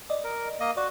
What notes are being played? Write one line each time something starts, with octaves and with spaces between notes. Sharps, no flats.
D5 D#5
A#4
A#3 D#5
F#4 D5